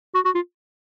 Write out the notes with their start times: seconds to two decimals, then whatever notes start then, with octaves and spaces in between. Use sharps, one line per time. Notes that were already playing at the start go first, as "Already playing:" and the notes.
0.15 F#4
0.25 F#4
0.35 F4